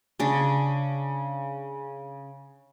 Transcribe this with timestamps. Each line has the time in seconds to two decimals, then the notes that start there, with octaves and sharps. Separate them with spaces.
0.20 C#3 D4